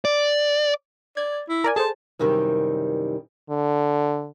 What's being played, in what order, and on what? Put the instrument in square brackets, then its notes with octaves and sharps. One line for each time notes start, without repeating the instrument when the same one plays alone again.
[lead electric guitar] D5
[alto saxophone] D5 [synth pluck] G#6
[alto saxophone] E4
[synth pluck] A#4 D5 G#5
[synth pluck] G#4 A4 C5 [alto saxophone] A5
[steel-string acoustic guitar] F#2 C3 D#3 E3 G3
[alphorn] D3